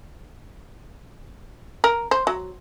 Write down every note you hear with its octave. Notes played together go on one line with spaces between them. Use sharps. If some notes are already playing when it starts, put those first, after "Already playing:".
A#4
C5
F#3